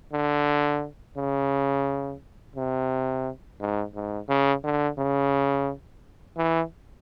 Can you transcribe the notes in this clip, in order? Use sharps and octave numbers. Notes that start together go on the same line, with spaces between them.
D3
C#3
C3
G#2
G#2
C#3
D3
C#3
E3